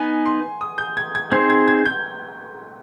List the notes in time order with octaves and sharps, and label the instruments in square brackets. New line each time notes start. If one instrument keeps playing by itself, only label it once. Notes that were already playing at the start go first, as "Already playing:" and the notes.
Already playing: [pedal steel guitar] B3 D#4 B4 [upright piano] G#5
[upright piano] C6
D#6
G6
G#6
G#6
[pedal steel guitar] C4 D#4 G#4 C5 [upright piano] G#6
[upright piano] G#6
G#6
G6